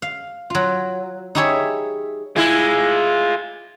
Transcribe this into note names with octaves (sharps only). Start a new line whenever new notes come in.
F5
F#3 F4
D#4 E4 G4 G#4 C#5 E5
G#3 E4 F4 G#5